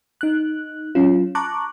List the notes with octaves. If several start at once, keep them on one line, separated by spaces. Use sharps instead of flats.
D#4 F#6
F#3 C#4 F4
A5 A#5 C#6 D6 F#6